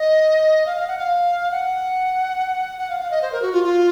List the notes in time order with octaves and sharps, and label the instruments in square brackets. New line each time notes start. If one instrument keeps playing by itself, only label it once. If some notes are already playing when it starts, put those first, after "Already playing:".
Already playing: [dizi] D#5
F5
F5
F#5
F5
F#5
F#5
F5
F5
D#5
C5
A#4
F#4
F4
F4